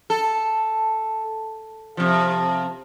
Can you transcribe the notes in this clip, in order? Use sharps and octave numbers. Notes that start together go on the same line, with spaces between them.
A4
C3 F3